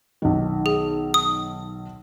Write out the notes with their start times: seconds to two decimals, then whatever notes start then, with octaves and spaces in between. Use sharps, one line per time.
0.22 B1 D#3
0.66 G#4
1.14 D#6